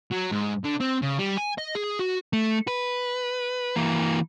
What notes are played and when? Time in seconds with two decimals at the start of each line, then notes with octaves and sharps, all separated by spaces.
0.12 F#3
0.32 G#2
0.64 D3
0.81 C4
1.02 C#3
1.19 G3
1.38 G#5
1.58 D#5
1.75 G#4
1.99 F#4
2.33 A3
2.68 B4
3.76 E3 A#3